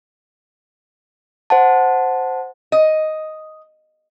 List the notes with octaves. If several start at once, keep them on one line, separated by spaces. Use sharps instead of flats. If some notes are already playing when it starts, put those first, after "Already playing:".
C5 F#5 A5
D#5